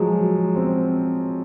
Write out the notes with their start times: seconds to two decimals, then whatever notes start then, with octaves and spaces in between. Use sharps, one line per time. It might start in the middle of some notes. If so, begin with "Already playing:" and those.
Already playing: F3 F#3 G#3
0.56 C4